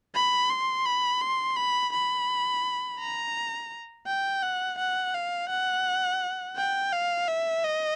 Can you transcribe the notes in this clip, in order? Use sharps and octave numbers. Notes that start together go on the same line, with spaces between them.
B5
C6
B5
C6
B5
B5
A#5
G5
F#5
F#5
F5
F#5
G5
F5
E5
D#5